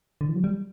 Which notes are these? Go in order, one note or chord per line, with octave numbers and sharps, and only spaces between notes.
D3
E3
F#3
G3